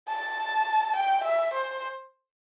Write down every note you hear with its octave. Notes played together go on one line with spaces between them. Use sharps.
A5
G5
E5
C5